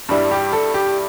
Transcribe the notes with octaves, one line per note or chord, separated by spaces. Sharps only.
G2 G3 D4 E4
G4
A4
G4